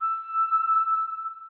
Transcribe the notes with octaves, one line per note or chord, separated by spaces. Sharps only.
E6